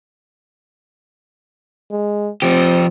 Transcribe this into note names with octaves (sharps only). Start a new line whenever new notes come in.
G#3
F3 C4 G4